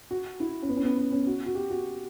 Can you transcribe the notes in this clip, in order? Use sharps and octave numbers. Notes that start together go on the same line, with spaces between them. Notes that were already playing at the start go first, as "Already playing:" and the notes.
F#4
E4
C#4
B3
C#4
B3
B3
C#4
F#4
F#4
G4
F#4